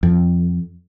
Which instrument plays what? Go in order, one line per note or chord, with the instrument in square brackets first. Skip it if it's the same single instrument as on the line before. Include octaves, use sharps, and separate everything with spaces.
[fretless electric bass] F2